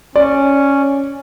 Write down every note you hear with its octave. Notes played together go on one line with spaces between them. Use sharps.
C#4 D5